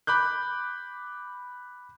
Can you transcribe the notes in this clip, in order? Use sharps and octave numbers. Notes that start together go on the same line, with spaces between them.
B5 D6 F#6 G6